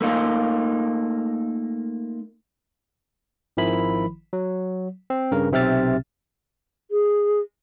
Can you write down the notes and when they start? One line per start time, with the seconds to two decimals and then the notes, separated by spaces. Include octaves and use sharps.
0.01 A3 A#3 D#4 F4
3.57 G#1 D#3 F3 E4 B5
4.33 F#3
5.10 C4
5.32 G2 C#3 A#4
5.52 B1 C3 C4 E5 F6 A6
6.91 G#4